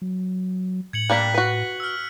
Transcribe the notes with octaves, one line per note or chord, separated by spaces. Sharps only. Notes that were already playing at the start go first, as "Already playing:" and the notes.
F#3
A2 G#6 C#7 F#7
G3 A#3 D4 F#6 B6
F#4 B4
E6 F6